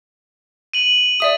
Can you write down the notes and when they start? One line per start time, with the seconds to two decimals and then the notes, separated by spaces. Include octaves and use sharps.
0.73 D#7 F#7
1.20 D5 E5 D#6